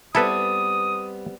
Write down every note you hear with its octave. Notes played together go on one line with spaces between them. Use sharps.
G3 B3 C4 E4 A4 B4 D#6